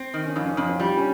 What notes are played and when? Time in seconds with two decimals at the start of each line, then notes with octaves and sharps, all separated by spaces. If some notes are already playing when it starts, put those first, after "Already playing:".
Already playing: C4
0.14 D#3
0.26 C#4
0.35 F2 D#4
0.46 C#4
0.57 F2 C#4
0.69 C4
0.79 G3 F4
0.88 D#4
0.97 C#4